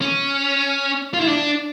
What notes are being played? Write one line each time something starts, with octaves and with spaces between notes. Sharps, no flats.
C#4
F4
E4
D4